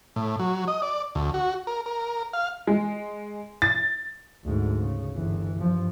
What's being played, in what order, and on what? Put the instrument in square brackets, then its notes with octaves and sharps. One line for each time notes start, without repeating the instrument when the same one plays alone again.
[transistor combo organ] A2
F#3
D#5
D5
D2
F#4
A#4
A#4
F5
[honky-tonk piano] G#3
A6
[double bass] D2 G#2
C#3
G1 E3
G2 F3